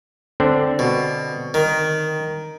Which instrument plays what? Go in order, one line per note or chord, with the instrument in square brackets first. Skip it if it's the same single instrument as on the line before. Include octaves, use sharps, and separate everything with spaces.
[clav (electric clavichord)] D3 C4 D4
[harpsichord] B2
D#3